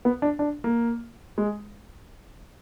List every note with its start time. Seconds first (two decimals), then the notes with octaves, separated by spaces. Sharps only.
0.05 B3
0.22 D4
0.39 D4
0.64 A#3
1.38 G#3